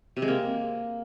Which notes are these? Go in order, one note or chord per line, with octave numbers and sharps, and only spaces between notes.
C3
G#3
A#3